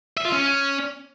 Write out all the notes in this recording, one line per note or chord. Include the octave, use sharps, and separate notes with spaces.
E5
F4
C#4